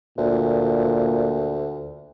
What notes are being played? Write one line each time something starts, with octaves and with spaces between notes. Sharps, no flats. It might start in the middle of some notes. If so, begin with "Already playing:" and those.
D2 A#2